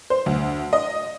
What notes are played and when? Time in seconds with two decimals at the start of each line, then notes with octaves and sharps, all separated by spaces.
0.10 C5
0.26 D2
0.73 D#5